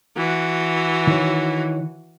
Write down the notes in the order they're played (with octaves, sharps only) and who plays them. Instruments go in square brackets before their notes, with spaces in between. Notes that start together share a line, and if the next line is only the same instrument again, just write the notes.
[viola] E3 F#4
[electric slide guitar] D#3 E4 C#5